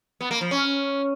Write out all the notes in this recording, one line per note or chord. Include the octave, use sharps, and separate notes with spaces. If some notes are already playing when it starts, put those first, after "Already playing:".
B3
A#3
F3
C#4